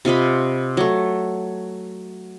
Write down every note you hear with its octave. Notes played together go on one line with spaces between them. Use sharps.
C3 F4 D#5 B5
F#3 A3